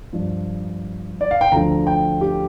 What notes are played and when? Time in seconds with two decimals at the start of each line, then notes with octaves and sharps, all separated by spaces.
0.13 G2 F3
1.21 D5
1.31 F5
1.41 G5
1.52 D2 D3 F3 A#5
1.87 G5
2.21 G4